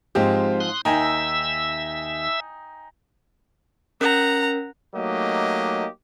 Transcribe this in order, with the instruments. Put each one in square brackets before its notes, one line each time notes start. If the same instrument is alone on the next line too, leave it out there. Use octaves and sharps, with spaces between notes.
[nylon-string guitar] G#2 F3 [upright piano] G#3 C4 G4
[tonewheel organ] C6 D#6 F#6
[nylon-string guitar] D#2 [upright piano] D#4 G5 G#5 [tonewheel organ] E5 E6
[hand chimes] C#4 A#4 [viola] F#5 A#5
[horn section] F#3 A3 A#3 D#4 G4 D#5